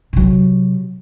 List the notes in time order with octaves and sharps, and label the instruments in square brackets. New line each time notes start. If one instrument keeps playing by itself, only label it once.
[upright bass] C3 F#3